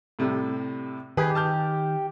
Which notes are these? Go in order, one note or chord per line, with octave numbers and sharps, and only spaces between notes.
A2 C3 G3
D#3 G4 G#4 B4
A5 F6 G6